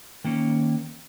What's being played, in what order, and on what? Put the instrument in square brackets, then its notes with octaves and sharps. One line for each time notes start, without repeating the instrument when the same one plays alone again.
[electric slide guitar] D#3 A#3 C#4